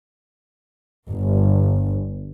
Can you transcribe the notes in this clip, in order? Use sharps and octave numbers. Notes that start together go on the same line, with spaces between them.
G1